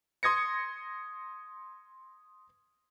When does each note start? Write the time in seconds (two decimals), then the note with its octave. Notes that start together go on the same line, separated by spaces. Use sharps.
0.23 C6 D#6 G#6 A#6 C#7